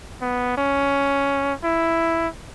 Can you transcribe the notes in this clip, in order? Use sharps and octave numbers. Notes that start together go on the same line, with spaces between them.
B3
C#4
E4